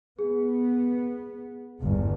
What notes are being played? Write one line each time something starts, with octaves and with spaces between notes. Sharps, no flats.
B3 G#4
G1 E2